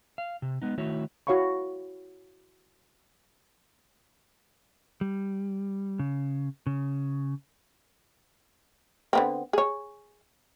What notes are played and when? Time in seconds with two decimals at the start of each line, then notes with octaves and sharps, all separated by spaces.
0.18 F5
0.42 C3
0.62 G#3 B3 D#4
0.78 D#3 A3 E4 F#4 C#5
1.27 E4 F#4 C#5 F5 B5 C#6
5.01 G3
5.99 C#3
6.67 C#3
9.13 D3 B3 C4
9.53 G#4 C#5